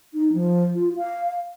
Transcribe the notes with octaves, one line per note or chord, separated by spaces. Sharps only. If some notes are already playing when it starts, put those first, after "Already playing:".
D#4
F3
F4
F5